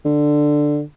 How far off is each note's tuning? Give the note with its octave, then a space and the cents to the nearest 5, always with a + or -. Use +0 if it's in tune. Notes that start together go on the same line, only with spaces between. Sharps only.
D3 +10